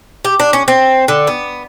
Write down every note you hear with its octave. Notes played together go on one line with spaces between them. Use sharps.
G4
D4
C#4
C4
D3
B3